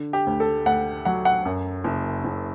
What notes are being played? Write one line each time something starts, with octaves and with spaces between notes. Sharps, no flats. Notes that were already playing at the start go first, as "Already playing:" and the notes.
Already playing: D3
G4
D2
A4
D2 F#5
F#3 F#5
F#5
F#2
F#1
F#1